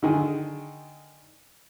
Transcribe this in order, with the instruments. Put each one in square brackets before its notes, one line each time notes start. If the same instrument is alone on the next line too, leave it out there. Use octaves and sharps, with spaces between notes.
[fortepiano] D3 D#3 G#4